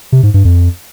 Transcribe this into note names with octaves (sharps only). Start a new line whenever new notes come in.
C3
G#2
G2
F2